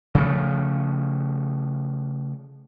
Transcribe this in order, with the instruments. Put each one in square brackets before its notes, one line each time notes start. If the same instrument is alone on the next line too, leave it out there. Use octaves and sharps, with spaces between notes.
[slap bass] C#3 F3 A3